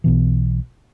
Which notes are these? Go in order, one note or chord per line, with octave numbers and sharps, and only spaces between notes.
B1 B2 E3